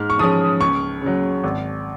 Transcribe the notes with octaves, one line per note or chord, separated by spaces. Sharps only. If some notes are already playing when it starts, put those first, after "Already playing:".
Already playing: G#2 F6
C#6
F3 G#3 C#4 D#6
C#2 C#6
C#3 F#3
G#1